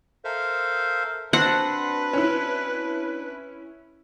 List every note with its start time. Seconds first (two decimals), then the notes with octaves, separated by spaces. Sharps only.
0.24 A4 A#4 C5 E5 F5
1.33 C4 D4 F#4 B4 F#5
2.13 C#4 E4